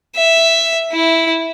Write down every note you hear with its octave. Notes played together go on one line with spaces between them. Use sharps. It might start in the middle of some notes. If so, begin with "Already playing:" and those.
E5
E4